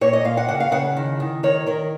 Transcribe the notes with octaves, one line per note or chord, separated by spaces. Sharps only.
A#2 C#5
D#5
A#2 F5
F#5
C#3 F#5
F5
C#3 F#5
D#3
D#3
D#3 C#5
D#3 A#4